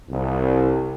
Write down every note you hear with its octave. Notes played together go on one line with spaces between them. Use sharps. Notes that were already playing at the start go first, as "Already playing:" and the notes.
C2